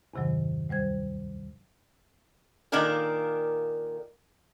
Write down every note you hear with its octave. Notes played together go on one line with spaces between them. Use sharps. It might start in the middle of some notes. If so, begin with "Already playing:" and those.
E2 G2 C3 D#3 F#3
D2 G3 C5 G#6
A#2 D#3 A#3 D4 A#4